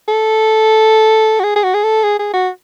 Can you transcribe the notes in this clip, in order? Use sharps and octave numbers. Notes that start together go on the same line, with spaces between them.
A4
F#4
G#4
G#4
F#4
G#4
A4
G#4
G#4
F#4